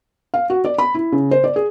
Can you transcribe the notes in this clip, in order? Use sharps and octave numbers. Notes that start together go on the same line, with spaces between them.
F5
F#4
D5
B5
E4
C#3
C5
D5
G#4